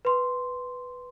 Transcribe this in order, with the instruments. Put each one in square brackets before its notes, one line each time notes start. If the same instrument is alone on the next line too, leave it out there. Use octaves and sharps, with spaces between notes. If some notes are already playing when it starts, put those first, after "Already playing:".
[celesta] B4 C6